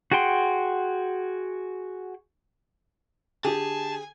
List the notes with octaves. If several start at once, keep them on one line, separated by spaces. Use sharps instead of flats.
F#4 G#4 F#5 G5 C6
D3 G4 G#4 G#5 A5